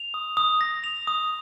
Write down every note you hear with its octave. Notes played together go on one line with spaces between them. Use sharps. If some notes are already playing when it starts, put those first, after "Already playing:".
Already playing: F7
D#6
D#6
A#6
F7
D#6